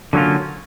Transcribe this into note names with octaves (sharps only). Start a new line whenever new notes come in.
D3 F#3 A#3 C#4 F4